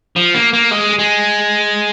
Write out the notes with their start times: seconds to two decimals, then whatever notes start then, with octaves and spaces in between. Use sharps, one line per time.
0.16 F3
0.35 A#3
0.53 A#3
0.71 G#3
0.99 G#3